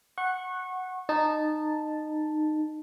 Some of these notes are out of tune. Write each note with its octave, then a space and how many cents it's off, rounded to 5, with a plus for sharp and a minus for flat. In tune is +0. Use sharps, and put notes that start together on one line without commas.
F#5 +0 C#6 -25
D#4 -20 A5 +0